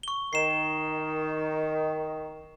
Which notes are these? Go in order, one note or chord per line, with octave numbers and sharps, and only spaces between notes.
C#6 G7
D#3 C7 E7